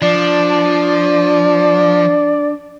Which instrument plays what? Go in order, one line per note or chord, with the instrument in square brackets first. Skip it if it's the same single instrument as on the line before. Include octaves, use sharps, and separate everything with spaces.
[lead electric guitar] F3 [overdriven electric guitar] D4 [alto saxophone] D5